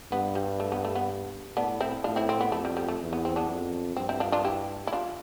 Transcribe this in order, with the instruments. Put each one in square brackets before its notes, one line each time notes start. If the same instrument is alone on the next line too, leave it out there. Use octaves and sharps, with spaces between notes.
[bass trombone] G2 [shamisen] B3
[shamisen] G3
A3
B3
A3
B3
[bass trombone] A2 [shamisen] B3 D4
[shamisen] C4 E4
[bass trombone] A2 [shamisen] D4 F4
[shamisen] C4 E4
C4
B3
[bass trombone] F2 [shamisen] A3
[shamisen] G3
G3
A3
[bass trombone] E2
[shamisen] B3
C4
B3 D4
[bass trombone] F2
[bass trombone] G2 [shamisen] C4
[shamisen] C4 E4
D4 F4
D4 F4
E4 G4
E4
D4 F4